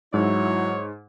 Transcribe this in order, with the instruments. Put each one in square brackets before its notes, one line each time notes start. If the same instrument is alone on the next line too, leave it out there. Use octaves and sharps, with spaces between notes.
[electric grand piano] G#2 [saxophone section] F#3 E4 [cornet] C#5